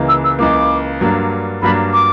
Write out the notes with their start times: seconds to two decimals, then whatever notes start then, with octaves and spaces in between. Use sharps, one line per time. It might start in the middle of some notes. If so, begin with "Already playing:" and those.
Already playing: C#2 C#3 E3 A#3
0.08 E6
0.24 E6
0.39 C#2 C#3 E3 A#3 D6
1.01 G2 F#3 A#3 D4
1.62 G2 F#3 A#3 D4 B5
1.93 D6